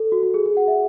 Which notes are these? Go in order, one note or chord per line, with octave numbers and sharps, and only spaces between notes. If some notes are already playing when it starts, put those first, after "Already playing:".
Already playing: A4
F#4
F#4
G#4
G#4
F#5
E5